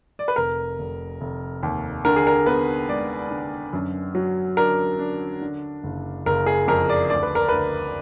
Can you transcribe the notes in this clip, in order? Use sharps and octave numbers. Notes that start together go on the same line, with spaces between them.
D5
B4
F1 A#4
F1
F1
D#2
D3 A#4
G#4
A#4
B3 B4
G#3 D5
D3
F#2
F#3
D4 A#4
D4
D3
F#1
F#1 A#4
G#4
F2 A#4
D5
D2 D5
B4
A#4
D2 B4